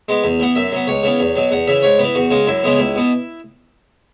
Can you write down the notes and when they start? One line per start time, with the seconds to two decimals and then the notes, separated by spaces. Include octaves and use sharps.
0.08 G#3 B3
0.24 E2
0.40 E3 B3 F#5
0.56 F#2 E5
0.72 F#3 B3
0.88 C#2 C#5
1.03 C#3 E3 B3
1.20 E2
1.35 B2 F#3
1.51 E2 F#5
1.68 C#3 E3 E5
1.83 G#2 C#5
1.99 E3 B3 B4
2.15 E2 F#4
2.30 C#3 G#3
2.47 F#2 E4
2.63 C#3 E3 G#3 B3
2.79 C#2 E4
2.95 B2 B3